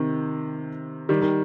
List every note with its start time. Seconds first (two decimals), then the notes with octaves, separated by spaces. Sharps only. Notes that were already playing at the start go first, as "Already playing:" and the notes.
Already playing: C3 D#3
1.09 D#3 G3
1.21 D#3